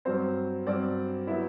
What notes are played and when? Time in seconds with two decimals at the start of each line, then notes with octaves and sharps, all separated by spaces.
0.05 G2 F#3 C4 C5
0.67 G2 F#3 C4 D5
1.27 F#3 B3 E4 E5